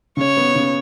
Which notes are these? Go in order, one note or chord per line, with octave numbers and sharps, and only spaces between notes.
C#3 C#5
B3
C#3